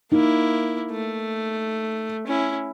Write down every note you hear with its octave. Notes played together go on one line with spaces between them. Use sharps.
A#3 D#4 E4
A3
C#4 E4